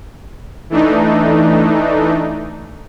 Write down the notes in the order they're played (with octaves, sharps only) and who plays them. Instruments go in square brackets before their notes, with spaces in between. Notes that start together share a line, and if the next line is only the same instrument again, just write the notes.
[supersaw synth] E3 A3 D4 D#4